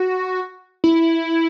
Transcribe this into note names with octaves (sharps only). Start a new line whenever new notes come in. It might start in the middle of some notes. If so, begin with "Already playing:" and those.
Already playing: F#4
E4